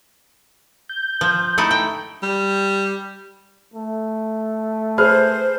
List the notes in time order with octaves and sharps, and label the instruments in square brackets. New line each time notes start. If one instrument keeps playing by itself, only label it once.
[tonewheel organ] G6
[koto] F3
A3 D#4 E4
G5
[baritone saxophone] G3
[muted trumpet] A3
[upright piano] G#4 B4 F6 [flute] C5